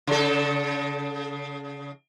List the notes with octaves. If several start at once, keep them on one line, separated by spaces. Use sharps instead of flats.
C#3 A4